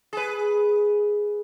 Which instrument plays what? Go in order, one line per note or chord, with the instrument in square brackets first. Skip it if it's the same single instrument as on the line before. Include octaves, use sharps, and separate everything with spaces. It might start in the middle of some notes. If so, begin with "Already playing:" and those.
[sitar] G#4 B4